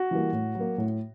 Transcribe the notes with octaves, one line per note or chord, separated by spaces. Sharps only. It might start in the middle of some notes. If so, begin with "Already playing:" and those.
Already playing: F#4
E3 G3 A#3
A2
F#3
A#3
A2